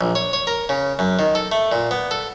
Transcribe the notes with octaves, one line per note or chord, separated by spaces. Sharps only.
A#1
C#5
C#5
A#4
C#3
F#2
D#3
A4
A3
A#2
B3
A4